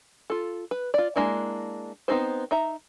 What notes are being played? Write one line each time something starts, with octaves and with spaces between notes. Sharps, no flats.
F4 A4
B4
F4 D5
G#3 A#3 D4 E4
B3 C4 D#4 G#4 C5
D#4 E5 A#5